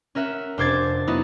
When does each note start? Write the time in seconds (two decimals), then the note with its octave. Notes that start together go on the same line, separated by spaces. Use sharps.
0.15 C#4 A#4 E5 F#5
0.58 F1 D4 C5 D6 G#6 A6
1.07 F#3 B3 D#4 E4